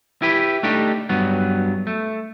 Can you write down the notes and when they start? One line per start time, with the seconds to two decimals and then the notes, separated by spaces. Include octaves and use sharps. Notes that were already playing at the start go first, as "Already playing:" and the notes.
0.22 E4 G4 B4
0.63 A3 D4 D#4 G4
1.09 G2 F#3 B3
1.87 A3